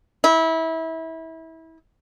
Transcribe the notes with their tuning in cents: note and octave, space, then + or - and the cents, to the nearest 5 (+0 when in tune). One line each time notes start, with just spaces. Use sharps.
E4 -25